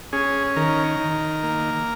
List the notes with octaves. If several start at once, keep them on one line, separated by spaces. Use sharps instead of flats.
C#4 G#4
D#3 A#4
D#3
A#3